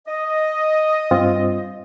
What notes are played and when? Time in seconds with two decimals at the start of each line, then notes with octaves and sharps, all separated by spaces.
0.07 D#5
1.11 G2 C4 F4